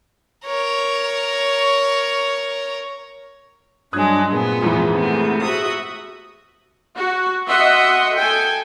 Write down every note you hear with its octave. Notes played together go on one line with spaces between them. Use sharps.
A#4 C#5
G2 F#3 G#3 D4 D#6 F#6 G#6
A#2 B3 C4 G#4
F2 G#2 E3
C3 A3 B3
F#4 E5 D#6
F#4
F#4 D#5 E5 F#5 C6
A4 G5 G#5